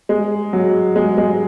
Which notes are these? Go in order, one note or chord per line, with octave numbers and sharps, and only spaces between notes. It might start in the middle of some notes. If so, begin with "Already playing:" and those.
G#3
F#3
G#3
G#3